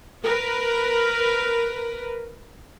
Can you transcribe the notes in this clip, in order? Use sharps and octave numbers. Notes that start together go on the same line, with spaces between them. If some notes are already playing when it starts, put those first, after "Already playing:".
A#4 B4